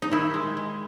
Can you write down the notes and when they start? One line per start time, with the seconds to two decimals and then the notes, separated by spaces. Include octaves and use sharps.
0.02 D#4
0.12 D#3 E4
0.34 G#3
0.57 G#3